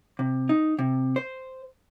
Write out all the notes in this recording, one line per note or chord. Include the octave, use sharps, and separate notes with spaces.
C3
D#4
C3
C5